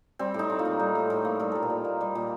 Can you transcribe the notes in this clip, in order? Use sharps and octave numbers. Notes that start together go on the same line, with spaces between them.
G3 C4
A2 D#4
A2
F4
A#3
G3
A2
A2
A#3
G3 A#4
A#2 A4
A#4
A#2
A#3
G3
A#2